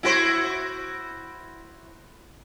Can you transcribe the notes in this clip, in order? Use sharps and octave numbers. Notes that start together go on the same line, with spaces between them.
E4 F#4 C5